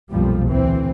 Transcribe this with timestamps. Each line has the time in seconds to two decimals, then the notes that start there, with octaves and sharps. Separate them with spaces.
0.10 B1 F2 A#2 F3 G3
0.49 D2 E3 C4